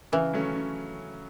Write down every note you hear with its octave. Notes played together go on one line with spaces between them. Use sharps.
C#3 E3
F#3 A3 C#4
C#3